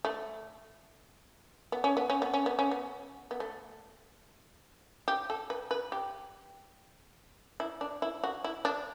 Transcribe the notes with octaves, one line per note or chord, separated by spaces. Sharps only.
A3
B3
C#4
B3
C#4
B3
C#4
B3
C#4
B3
B3
A3
G4
A4
B4
B4
G4
E4
D4
E4
F#4
E4
D4